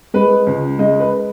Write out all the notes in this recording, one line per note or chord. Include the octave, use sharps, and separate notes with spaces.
G#3 B4
C#2
G#3 D#5
B4